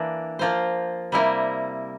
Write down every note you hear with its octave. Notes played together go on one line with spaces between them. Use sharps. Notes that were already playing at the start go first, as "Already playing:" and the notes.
Already playing: E3 A#3 D4
F3 A#3 F4 C5
C3 G3 A#3 E4 A#4